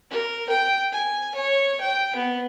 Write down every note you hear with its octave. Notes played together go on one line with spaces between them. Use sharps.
A#4
G5
G#5
C#5
G5
B3